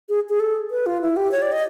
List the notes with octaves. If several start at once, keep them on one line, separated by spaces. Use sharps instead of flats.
G#4
G#4
A4
B4
F4
E4
G4
C#5
D5
D#5